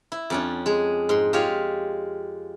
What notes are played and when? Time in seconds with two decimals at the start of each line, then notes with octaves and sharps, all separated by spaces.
0.12 E4
0.30 F2 C#4 D4
0.66 G#3 G#4
1.09 G#2 C6
1.33 G#3 F4 G4 C#5 F5